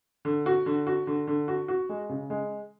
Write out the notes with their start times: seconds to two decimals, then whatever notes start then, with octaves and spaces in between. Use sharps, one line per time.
0.25 D3
0.46 F#4
0.66 D3
0.87 F#4
1.07 D3
1.27 D3
1.48 F#4
1.68 F#4
1.89 G#3
2.09 C#3
2.30 G#3